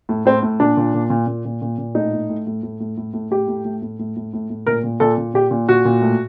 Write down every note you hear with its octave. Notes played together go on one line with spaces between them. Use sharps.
A2
A2 C4
A2
A#2 D4
A#2
A#2
A#2
A#2
A#2
A#2
A#2
A2 D#4
A2
A2
A2
A2
A2
A2
A2
A2 G4
A2
A2
A2
A2
A2
A2
A2
A#2 A#4
A#2
A#2 A4
A#2
A#2 G4
A#2
A#2 F#4
A#2
A2